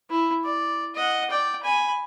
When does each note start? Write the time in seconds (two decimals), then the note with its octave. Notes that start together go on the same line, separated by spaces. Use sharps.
0.10 E4
0.44 D5
0.95 D#5 F#5
1.30 D5 G5
1.63 G#5 B5